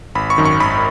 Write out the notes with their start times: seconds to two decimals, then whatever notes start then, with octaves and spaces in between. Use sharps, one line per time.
0.15 G#1 B5
0.30 C#6
0.38 F#2 D#3
0.45 C#6
0.60 G#1 B5